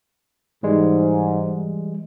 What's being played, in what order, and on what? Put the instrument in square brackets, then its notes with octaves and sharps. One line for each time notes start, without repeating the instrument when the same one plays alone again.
[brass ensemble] G#2 [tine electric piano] E3 G3 G#3